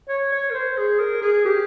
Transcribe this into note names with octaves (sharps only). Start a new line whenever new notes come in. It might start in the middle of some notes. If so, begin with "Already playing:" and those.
C#5
C#5
A#4
C5
G#4
A#4
G#4
G4